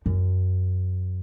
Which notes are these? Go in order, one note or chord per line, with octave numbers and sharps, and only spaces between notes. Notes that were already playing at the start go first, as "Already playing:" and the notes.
F#2